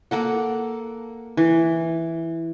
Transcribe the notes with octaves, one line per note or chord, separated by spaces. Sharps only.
A#3 A4 F#5
E3